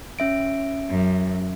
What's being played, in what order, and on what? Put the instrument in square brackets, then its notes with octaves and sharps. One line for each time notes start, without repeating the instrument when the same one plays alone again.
[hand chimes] C#4 E5 D7
[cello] F#2